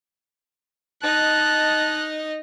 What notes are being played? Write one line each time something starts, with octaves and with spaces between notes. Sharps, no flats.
D#4 D#5 A5 F#6